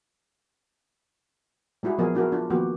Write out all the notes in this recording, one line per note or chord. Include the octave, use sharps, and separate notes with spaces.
G3 G#3 E4 F#4 G#4
F3 F#3 B3 F#4 G#4 A#4
D4 E4 F#4 G#4 A#4
D4 F4
D#3 F3 A#3 B3 F#4 G4